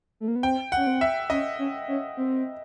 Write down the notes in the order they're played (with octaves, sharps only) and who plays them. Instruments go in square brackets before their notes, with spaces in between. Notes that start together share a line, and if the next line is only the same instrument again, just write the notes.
[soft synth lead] A3
A#3
B3
[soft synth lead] C4 [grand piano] G5
[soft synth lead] C#4 [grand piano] F#5
[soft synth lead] C4
[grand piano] E5
[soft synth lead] C#4 [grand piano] D#5
[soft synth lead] C#4
C#4
C4